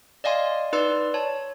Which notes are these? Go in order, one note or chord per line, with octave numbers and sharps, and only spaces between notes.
D5 D#5 F5 G#5 C6
D#4 B4 D5 C6 E6
C#5 A5